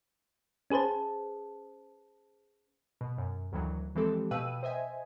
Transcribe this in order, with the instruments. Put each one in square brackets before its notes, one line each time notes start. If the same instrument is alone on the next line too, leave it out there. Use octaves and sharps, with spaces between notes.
[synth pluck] C#4 G#4 B4 C5 A5
[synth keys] B2
F#2
D2 D#3 E3 F#3
E3 F3 G#3 C4 G4 A4
B2 B4 F5 G5 E6 D#7
C5 D#5 E5 G#5